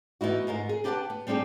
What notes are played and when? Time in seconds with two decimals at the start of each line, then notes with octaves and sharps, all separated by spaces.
0.21 E3 B3 D#4 E4 F#4
0.47 G#2 D#4 F4 A#4
0.69 G#4
0.84 D4 G4 B4 F5 F#5 A5
1.10 B3
1.27 G3 C4 D4 D#4 G#4 G5